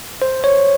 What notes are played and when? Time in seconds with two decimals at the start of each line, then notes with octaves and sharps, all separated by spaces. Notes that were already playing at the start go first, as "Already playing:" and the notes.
0.22 C5
0.44 C#5